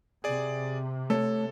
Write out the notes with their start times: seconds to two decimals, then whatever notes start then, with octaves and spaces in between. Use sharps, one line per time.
0.24 C3 G#4 D5
1.10 A3 A4 C#5